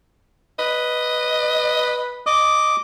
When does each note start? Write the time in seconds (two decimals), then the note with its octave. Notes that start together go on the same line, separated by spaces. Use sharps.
0.59 B4 D#5
2.27 D#5 D6